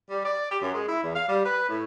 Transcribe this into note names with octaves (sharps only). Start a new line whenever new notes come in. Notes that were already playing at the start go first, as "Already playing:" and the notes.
G3
D5
G4
F#2
G#3
E4
E2
F5
G3
B4
A2